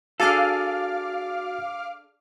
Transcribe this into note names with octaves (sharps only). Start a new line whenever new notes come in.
D4 F#4 G#4 A4 F5 D6 F6 A6